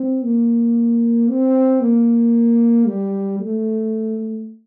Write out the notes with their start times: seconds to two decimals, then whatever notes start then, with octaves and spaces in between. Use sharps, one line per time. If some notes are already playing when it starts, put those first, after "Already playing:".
Already playing: C4
0.24 A#3
1.29 C4
1.81 A#3
2.86 G3
3.40 A3